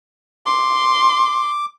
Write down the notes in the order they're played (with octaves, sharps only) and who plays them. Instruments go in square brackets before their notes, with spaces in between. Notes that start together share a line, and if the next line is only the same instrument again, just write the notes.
[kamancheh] C6 [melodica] D6